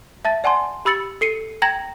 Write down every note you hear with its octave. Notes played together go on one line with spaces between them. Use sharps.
E5 A5 A6
D5 F#5 G#5 A5 C6
G4 B5 E6 A6 C#7 F#7
A4 C7 C#7 D#7
G5 A#5 G#6 A#6 F#7